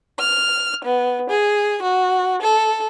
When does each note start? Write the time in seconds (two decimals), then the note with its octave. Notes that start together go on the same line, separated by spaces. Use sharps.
0.19 F6
0.84 B3
1.30 G#4
1.82 F#4
2.41 A4